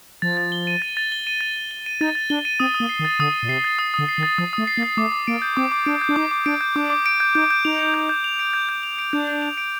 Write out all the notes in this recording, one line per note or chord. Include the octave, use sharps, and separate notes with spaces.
F3 A6
A6
G7
D#7
A6
A6
G7
D#7
A6
A6
G7
D#7
D#4 A6
A6
D4 G7
D#7
C4 D#6
D#6
A#3
C7
D#3
A6
D3 D#6
D#6
A#2
C3 C7
A6
D#6
D3 D#6
C7
D#3
A6
F3 D#6
A3 D#6
C7
A#3
A6
A3 D6
D6
A#3 D7
G6
C4 D6
D6
D4 D7
G6
D4
D#4 D6
D6
D4 D7
G6
D4 D6
D6
D7
G6
D#4 G6
G6
D#4 F7
D7
G6
G6
F7
D7
G6
G6
F7
D7
D4 G6
G6
F7
D7